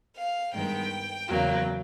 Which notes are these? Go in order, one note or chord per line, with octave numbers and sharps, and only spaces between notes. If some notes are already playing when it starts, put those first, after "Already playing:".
F5
G2 D#3 G#3 B3 G5
E2 C#3 F#3 A#3